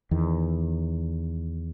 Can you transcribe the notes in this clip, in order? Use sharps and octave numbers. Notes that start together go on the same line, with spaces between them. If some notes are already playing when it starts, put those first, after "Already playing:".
E2 D#3